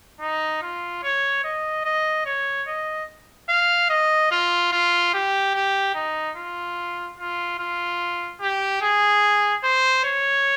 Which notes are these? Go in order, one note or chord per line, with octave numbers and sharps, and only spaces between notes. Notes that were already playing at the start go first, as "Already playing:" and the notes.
D#4
F4
C#5
D#5
D#5
C#5
D#5
F5
D#5
F4
F4
G4
G4
D#4
F4
F4
F4
G4
G#4
C5
C#5